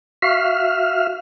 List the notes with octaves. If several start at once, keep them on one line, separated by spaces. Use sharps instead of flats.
F#4 E5 F5 F6